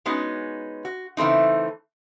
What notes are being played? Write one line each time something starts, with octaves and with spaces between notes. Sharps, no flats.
G#3 B3 C#4 D#4 F#4
F#4
C#3 E3 A3 C4 D#4